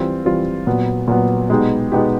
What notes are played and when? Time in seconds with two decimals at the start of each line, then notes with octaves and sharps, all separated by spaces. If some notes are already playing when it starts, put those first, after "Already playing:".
Already playing: E3 G3 C4 F4
0.25 E3 G3 C4 F4
0.67 A#2 F#3 B3
1.08 A#2 F#3 B3
1.50 B2 G#3 B3 D#4 G4
1.92 B2 G#3 B3 D#4 G4